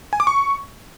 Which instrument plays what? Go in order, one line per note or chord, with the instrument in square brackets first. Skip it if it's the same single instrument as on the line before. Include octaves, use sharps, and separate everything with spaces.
[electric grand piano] G#5
D6
C#6